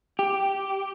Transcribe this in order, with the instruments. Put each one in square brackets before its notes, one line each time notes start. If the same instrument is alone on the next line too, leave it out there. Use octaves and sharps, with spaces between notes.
[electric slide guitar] G4